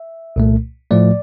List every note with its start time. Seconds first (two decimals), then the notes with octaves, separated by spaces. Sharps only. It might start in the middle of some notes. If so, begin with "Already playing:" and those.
Already playing: E5
0.36 C2 A#2 A3
0.91 A2 F3 A3 D5